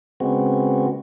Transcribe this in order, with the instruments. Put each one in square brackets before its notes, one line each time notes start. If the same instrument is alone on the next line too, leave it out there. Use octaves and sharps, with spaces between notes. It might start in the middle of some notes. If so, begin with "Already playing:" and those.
[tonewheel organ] C#3 G#3 B3 C4 F#4